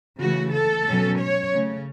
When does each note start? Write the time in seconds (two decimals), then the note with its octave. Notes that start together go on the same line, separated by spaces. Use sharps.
0.21 C#3 E3 A3 F#4
0.54 A4
0.87 B2 F#3 C#4
1.20 C#5
1.53 C#3 A3 C#4